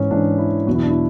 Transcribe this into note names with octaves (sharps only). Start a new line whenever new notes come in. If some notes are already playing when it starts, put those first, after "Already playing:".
Already playing: G#2 E3 C#4
G#2 E3 D4
E4
E2 B2 F#3 F#4
E4
D4
E4